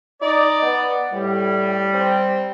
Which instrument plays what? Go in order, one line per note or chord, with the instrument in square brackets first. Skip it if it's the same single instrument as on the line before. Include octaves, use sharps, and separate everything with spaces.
[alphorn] D#4 [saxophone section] D5
[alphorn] B3
[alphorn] A2 [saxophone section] G3
[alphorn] C4